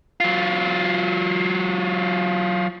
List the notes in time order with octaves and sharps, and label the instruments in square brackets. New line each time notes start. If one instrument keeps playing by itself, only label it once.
[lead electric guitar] F#3 F4